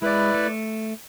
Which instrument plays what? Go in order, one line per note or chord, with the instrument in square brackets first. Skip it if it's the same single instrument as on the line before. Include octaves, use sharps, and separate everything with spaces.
[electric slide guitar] G#3 [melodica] E4 B4 D5
[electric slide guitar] A3